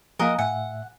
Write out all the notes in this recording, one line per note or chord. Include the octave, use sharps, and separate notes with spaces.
F3 A#3 A#4 D#5 F5 F#5 G#5
A2 E5 F#5 G#5